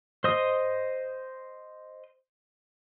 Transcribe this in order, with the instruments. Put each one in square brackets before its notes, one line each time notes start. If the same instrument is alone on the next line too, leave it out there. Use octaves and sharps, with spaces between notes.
[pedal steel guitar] C5 D#5 D#6